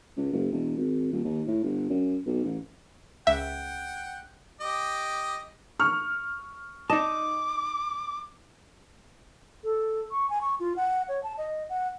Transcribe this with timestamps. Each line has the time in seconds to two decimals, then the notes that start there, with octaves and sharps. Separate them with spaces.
0.17 C#2
0.33 F#1
0.52 E1
0.77 G#1
1.13 D#1
1.24 D#2
1.47 A2
1.64 G1
1.90 F#2
2.26 B1
2.44 A1
3.27 C#2 E5 F#5 G5
4.61 G4 D#5 D6
5.79 C#6 F6
6.90 D#4 D#5 A5 D6
9.64 A4
10.11 C#6
10.30 G#5
10.41 C#6
10.60 F4
10.76 F#5
11.09 C#5
11.23 A5
11.38 D#5
11.70 F#5